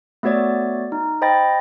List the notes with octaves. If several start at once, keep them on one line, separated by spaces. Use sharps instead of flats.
A3 B3 F#4 C#5 D5 A6
D#4
C5 D#5 G5 B5 A6 A#6